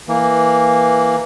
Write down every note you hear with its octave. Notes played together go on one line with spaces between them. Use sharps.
E3 A#3